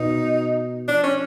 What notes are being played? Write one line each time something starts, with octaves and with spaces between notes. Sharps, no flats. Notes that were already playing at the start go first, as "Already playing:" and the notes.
Already playing: B2 D#4
F3 D4
C#4